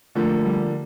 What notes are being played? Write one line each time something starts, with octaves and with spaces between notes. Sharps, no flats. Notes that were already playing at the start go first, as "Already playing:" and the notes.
D3 F3 A3 A#3
G3